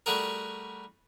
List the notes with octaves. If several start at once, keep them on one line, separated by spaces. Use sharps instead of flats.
G3 A3 F#4 G#4 A#4